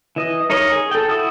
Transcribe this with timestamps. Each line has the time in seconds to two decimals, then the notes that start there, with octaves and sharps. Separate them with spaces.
0.16 E3 D#5
0.50 D#4 A#4 C#5 D#5
0.72 G#4
0.91 A4 G5
1.08 E4 F#4 D#6 E6